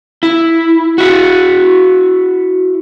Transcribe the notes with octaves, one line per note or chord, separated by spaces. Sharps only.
E4
E4 F#4